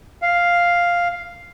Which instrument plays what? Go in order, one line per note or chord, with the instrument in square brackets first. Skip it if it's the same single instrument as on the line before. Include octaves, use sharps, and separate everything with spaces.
[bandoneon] F5